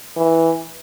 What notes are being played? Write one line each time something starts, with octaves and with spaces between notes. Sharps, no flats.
E3